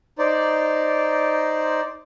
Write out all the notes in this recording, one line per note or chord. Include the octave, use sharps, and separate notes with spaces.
D#4 C5 D5